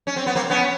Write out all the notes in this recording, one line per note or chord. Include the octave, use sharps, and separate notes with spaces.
C#4
C4
B3
A#3 C4
B3 C#4